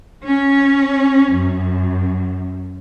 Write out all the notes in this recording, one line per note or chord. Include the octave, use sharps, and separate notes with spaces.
C#4
F#2